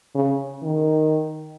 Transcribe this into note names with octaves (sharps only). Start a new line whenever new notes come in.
C#3
D#3